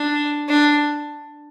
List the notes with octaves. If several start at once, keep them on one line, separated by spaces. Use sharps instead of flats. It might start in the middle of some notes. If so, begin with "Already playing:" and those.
Already playing: D4
D4